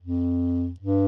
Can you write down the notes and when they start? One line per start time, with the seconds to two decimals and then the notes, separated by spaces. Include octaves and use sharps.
0.01 F2
0.80 G2